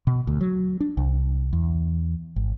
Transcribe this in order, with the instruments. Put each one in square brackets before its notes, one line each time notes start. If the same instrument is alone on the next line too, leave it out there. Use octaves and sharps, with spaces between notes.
[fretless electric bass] B2
D2
F#3
D4
C2
E2
G#1